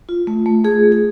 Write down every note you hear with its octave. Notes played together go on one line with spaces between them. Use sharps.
F4
A3
A3
A3 G#4
A3
G#4